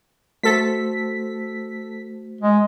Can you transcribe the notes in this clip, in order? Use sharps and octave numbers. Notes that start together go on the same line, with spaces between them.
A3 F#4 A4 C5 B6
G#3